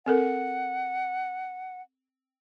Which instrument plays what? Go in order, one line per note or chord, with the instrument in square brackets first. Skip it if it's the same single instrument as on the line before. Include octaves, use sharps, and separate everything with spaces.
[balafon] C4 A4 A#4 [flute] F#5